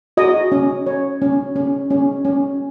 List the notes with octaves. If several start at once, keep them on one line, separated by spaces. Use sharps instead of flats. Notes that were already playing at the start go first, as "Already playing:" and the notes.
F#4 D#5
C#4
C#5
C#4
C#4
C#4
C#4